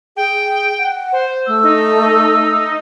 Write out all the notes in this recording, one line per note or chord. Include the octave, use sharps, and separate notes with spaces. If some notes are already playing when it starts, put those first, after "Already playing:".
G#4 G5
F#5
C5
A3 E6
D#4